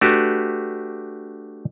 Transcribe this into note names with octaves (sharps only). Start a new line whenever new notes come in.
A3 D4 F#4 G4 B4